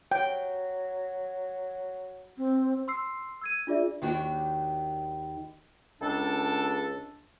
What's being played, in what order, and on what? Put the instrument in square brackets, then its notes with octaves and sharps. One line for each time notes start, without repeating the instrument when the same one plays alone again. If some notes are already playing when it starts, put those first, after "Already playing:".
[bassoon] F#3 [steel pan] G5
[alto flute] C4
[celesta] C6 E6 C7
E6 G#6 D#7
D4 F4 G#4 D5 E5
[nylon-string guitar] D#2 D#3 D4 F#4 G5
[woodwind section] C#2 D4 A4